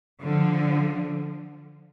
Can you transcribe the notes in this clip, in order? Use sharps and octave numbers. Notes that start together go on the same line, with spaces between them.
D3 F3